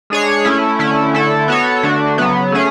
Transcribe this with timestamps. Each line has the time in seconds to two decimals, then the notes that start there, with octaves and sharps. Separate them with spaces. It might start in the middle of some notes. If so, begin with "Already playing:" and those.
0.10 G#3 D4 G#4 C#5
0.45 A3 C#4 E4
0.79 D3 A3 C#4 E4
1.14 D3 A3 E4 A4
1.48 B3 F#4 A4 C#5
1.83 D3 A3 D4 F#4
2.18 C#3 F#3 B3
2.52 A3 C#4 G#4